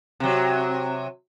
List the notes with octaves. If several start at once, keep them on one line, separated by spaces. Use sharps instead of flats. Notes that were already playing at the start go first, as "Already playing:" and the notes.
C3 F#3